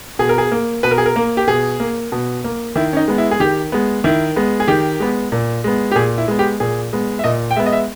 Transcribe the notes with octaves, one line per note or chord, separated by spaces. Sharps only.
B2 G#4
A#4
G#4
A#3
B2 B4
A#4
G#4
A#4
A#3
G4
B2 G#4
A#3
B2
A#3
D#3 E4
C#4
D#4
G#3 B3
E4
G#4
D#3 G4
G#3 B3
D#3 E4
G#3 B3
G#4
D#3 G4
G#3 B3
A#2
G#3 B3
G4
A#2 G#4
E4
G#3 B3
G4
A#2 G#4
G#3 B3
E5
A#2 D#5
G5
G#3 B3 E5
D#5
E5